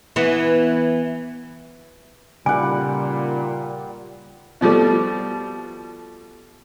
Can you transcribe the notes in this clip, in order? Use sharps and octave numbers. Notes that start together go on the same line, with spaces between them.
E3 B3
A#2 C#3 G3 D#4 F#5 G#5
B2 F3 G3 A3